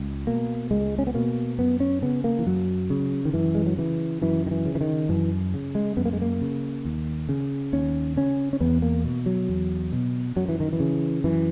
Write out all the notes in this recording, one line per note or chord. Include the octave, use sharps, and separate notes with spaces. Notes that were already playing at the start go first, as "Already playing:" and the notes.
Already playing: C#2
B2 A#3
C#2 G#3
C#4
B3
B2 A#3
F#2 B3
C#4
C#3 B3
A#3
E3
F#2 F#3
C#3
D#3
F#2 E3
G#3
F#3
C#3 E3
F#2 E3
D#3
E3
C#3
E3
D#3
F#2 E3
C#3
G#3
F#2 B3
A#3
G#3
A#3
C#3
D#2
C#3
D#2 C#4
C#3 C#4
C#4
E2 B3
A#3
B2
F#3
E2
B2
F#2 F#3
E3
D#3
E3
C#3
F#2 E3